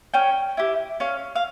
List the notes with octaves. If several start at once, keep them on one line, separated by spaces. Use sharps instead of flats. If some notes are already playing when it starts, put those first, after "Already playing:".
C#4 G5
E4 G4
C#4 F5
F5